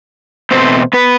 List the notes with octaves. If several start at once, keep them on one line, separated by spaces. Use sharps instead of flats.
E2 B2 A3 C4 C5
B3 B4